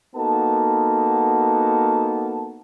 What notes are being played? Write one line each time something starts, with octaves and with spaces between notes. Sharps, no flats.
A#3 B3 D#4 F#4 A4 A5